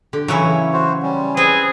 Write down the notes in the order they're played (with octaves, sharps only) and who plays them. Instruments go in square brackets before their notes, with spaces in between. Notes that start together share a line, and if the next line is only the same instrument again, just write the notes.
[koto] D3 [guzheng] G4
[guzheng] C#3 E4 C#5 [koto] E3 F#3
[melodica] F#4 C5
G3 C#4
[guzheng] C4 [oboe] G#4 [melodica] B4